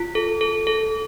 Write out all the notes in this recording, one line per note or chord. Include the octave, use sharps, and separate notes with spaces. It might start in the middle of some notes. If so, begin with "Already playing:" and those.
Already playing: F4
A4
A4
A4